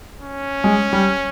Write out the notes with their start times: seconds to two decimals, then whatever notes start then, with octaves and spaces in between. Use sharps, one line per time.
0.21 C#4
0.64 G#3
0.93 G3